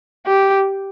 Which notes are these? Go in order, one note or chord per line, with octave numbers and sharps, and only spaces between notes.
G4